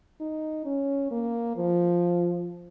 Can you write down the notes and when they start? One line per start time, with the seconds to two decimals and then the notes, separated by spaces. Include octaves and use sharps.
0.21 D#4
0.65 C#4
1.11 A#3
1.56 F3